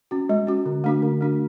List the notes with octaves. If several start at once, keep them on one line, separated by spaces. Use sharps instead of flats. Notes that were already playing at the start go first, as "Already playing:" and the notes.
C#4 F#4
G#3
C#4 F#4
D3
A3 D4 F#4
D3
A3 D4 F#4